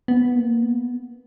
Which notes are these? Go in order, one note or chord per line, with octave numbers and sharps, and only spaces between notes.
B3
A#3
B3